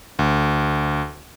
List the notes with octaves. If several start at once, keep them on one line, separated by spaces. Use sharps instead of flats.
D2